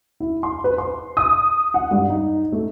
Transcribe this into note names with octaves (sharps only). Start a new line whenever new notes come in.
E4
C6
B4
C6
D#6
F#5
G2
D#4
A3